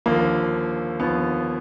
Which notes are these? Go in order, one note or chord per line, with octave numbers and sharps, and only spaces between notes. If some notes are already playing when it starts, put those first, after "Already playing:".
D#2 D3 F3 A#3
D#2 D3 F3 B3